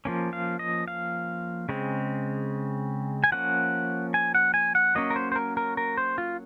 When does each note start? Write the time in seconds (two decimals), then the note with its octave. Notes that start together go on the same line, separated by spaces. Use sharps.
0.05 F3 A#3 C#4
0.33 F5
0.59 D#5
0.88 F5
1.69 C#3 G#3 C4
3.24 G#5
3.32 F3 A#3 C#4 F#5
4.14 G#5
4.35 F#5
4.54 G#5
4.75 F#5
4.95 F#3 A#3 C#4 D#5
5.10 A#4
5.16 C5
5.32 C5
5.36 A#4
5.57 A#4
5.77 A#4
5.97 C5
6.18 F4